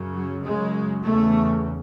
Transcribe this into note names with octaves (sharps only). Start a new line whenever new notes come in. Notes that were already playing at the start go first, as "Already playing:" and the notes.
Already playing: F#2 C#3
F#3
F#2 C#3 G#3
E2 C#3 A3